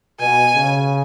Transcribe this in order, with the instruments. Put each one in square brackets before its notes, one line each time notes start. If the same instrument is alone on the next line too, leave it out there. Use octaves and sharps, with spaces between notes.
[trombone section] B2 [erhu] G#5
[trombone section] C#3